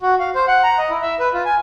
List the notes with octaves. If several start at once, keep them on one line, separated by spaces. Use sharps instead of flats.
F#4
F5
C5
F#5
A#5
D#5
E4
E5
B4
F4
G#5